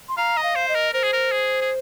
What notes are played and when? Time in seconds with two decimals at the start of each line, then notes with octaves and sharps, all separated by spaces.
0.09 C6
0.17 F5 A#5
0.37 D#5
0.43 F5
0.55 C5
0.69 D#5
0.75 A#4
0.93 A#4 C5
1.03 G#4
1.13 A#4
1.32 G#4
1.62 G#4